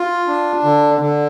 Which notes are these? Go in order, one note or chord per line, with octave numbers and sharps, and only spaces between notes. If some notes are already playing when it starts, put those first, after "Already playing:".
Already playing: F4
D4
D3
D3